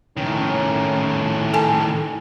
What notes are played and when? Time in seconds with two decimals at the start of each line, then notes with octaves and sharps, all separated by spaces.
0.17 A2 D#3 C#4
1.54 A4 G#5 A5